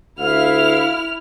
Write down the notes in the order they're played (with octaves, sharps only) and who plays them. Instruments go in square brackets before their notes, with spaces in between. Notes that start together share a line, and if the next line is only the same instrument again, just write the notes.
[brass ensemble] D2 E5 F5 [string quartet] E4 F6